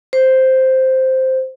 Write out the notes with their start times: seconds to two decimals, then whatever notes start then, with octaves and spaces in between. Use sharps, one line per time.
0.13 C5